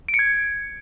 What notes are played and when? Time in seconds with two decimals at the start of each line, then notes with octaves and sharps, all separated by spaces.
0.08 D7
0.14 C#7
0.19 G#6